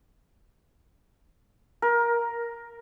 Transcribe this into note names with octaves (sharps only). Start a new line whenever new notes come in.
A#4